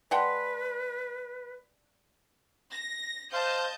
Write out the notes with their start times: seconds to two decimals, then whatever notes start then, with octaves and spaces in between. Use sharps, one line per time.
0.11 G#3 B4 D5 F#5 G5 A5 C6
2.72 A#6
3.33 C5 D#5 F5 A5 G6